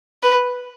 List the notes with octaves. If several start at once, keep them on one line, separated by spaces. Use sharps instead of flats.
B4